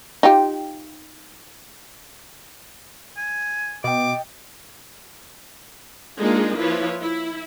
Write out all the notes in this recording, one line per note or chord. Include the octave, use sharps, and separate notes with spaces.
D#4 F4 G4
G#5
B2 D#5 G5 D6
G#3 A#3 D4 D#4 F4 G#4
F3 E4 F4 B4 C#5
E4